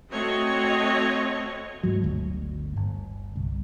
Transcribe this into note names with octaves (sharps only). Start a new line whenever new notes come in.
A3 C4 F#4 C#5 D#5
G#2 F#3
G1 D2
G1
C2